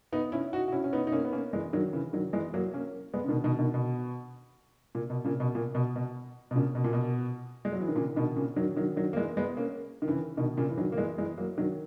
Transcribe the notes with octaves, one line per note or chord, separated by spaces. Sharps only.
B3 D#4
C#4 E4
D#4 F#4
F#4
C#4 E4
C#4
B3 D#4
D#4
A#3 C#4
B3
A#3 C#4
E3 G#3
D#3 F#3
C#3 E3
D#3 F#3
E3 G#3
F#3 A#3
A#3 C#4
G#3 B3
C#3
B2 D#3
B2 D#3
B2 D#3
B2
A#2
B2
A#2 C#3
B2
A#2
B2
B2
B2
A#2 C#3
B2
A#2
B2
G#3
F#3
E3
D#3
A#2 C#3
B2 D#3
A#2 C#3
D#3 F#3
D#3 F#3
D#3 F#3
A#3
E3 G#3
G#3 B3
A#3 C#4
D#3
C#3 E3
B2 D#3
A#2 C#3
E3
D#3 F#3
A#3
E3 G#3
E3 G#3
F#3 A#3
D#3 F#3